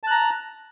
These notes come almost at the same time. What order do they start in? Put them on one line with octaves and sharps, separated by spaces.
A5 F#6 A#5